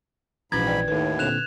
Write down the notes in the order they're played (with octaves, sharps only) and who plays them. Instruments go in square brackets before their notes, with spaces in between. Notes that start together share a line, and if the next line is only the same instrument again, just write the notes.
[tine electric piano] A#1 E3 [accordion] G#2 B5 [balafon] C#4 F#4 B4 [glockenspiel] G#6
[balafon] B4 D5 G5
[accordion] D#2 A2 [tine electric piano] D#3 [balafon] D#4 A4 B4
[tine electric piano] A#2 D3 C4 [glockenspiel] F#6 E7 F7